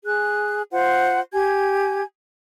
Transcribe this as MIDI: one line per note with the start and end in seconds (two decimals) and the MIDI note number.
0.05 0.61 68
0.05 0.61 90
0.71 1.20 65
0.71 1.20 72
0.71 1.20 78
1.33 2.03 67
1.33 2.03 80
1.33 2.03 92